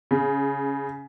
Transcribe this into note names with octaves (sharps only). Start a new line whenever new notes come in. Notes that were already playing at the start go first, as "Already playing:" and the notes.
C#3